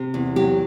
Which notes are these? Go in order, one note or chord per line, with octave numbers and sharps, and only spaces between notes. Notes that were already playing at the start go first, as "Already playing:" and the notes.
Already playing: C3
E2
F#3 G4